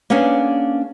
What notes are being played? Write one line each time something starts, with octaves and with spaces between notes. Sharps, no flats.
A#3 B3 C#4 D4 G#4